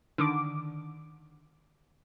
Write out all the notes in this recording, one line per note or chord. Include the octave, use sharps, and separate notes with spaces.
D3 D#3 D6